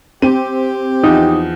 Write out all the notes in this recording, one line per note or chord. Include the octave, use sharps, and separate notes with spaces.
C4 G4 D#7
E2 F3 D#4